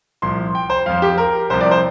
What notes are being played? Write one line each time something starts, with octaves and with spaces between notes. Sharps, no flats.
C2 A#2 F3 C6
G5
C5
F2 F3 F5
G4
A#4
C2 C3 F3 C5
D5
C5